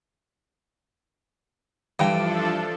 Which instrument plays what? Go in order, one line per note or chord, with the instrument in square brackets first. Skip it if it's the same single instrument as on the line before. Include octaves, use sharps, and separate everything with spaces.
[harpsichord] G2 [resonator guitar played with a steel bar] E3 G5 [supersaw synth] F3 D4 A4